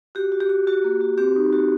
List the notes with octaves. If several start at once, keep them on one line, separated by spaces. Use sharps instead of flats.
F#4 G4
F#4
G4
F#4
F#4
A#3
F#4
C4 G4
D#4
F#4